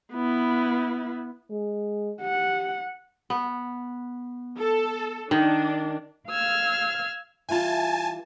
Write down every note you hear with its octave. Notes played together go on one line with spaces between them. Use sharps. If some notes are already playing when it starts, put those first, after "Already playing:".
B3 E4
G#3
G4 F#5
B3
A4
D#3 D4
F5 E6 F6 G#6
E3 G3 F4 G#5 A5